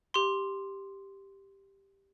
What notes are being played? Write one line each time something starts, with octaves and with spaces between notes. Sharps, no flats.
G4 C6